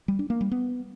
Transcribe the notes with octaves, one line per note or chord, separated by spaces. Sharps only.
G3
D4
A#3
G3
B3